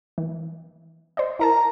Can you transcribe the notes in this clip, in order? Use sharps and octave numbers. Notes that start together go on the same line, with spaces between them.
E3
C5 D5 D#5
E4 A#4 A5 A#5